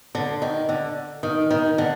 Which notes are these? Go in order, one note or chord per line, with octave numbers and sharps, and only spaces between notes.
D3
D#3
D3
D#3
D#3
D3